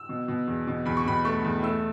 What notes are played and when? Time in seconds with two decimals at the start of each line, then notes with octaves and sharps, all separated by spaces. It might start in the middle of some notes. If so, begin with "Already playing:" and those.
Already playing: E6
0.09 B2
0.28 B2
0.47 E2
0.67 B2
0.85 E2 B5
0.97 C#6
1.05 B2 B5
1.25 A3 C#6
1.44 E2
1.63 A3 E6